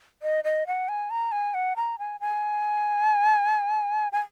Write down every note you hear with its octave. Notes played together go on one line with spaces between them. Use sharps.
D#5
D#5
F#5
G#5
A#5
G#5
F#5
A#5
G#5
G#5
G#5